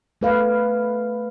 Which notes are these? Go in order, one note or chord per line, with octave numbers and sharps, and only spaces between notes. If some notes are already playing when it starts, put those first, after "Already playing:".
A3 B4 F5